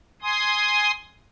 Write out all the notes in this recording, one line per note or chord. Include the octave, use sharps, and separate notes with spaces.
G#5 C6 D#6